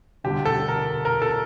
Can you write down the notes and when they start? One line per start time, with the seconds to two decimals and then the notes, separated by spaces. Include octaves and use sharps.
0.24 E1 D2 D3 G3 G4
0.45 A4
0.68 A#4
1.05 A#4
1.22 A4